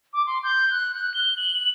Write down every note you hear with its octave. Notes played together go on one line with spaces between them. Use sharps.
D6
C6
G6
F#6
F#6
G7
F#7